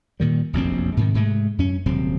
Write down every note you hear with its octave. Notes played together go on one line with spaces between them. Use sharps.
A#2 D#3 G3
F1 A#1 F#2 C4
G#2 C3 D#3
G#2 C3 G#3 A3
F#2 C#4
D#1 C3 F#3 C4